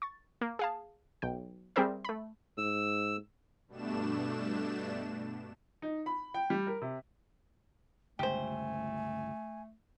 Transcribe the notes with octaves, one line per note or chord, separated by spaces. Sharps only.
C#6 A6
A#3
G#4 F5 A5
B1 G5
G3 C4 G#4 A#4 C5 E5
A3 B5
G#2 E6
G2 B2 A3 D4 E7
D#4
B5
G5
G3
A#4
C3
G1 C#2 A3 G4 C5 G#5